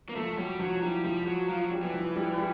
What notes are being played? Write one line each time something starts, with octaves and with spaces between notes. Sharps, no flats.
A#3
F3 A3
F#3 G3
F3 F#3
E3 G3
F3 G3
F#3
F3 F#3
F#3
G3
E3
F3
G3
G3